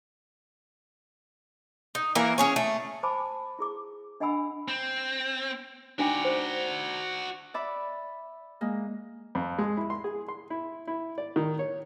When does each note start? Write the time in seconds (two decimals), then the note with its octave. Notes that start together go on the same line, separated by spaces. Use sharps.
1.95 D#4
2.15 E3 A#3 A#4
2.38 C#4 G#4 C#5
2.56 A3
3.03 C5 G#5 A5 B5 D6
3.59 E4 G#4 D6
4.20 D4 D#5 F#5 G#5 B5 E6
4.68 C4
5.99 D4 D#4 F#4 D5 G5
6.25 C5
7.54 D5 E5 B5
8.61 G#3 A#3
9.35 F2
9.59 G#3
9.77 E4
9.90 C6
10.04 G#4
10.28 C6
10.50 E4
10.87 E4
11.18 D5
11.36 D#3
11.59 C#5